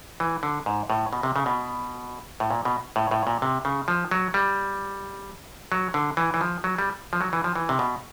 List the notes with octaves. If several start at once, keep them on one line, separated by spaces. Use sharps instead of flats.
E3
D3
G#2
A2
B2
C3
C#3
B2
A2
A#2
B2
A2
A2
A#2
C3
C#3
F3
F#3
G3
F#3
D3
E3
E3
F3
F#3
G3
F3
F#3
E3
F3
E3
C3
B2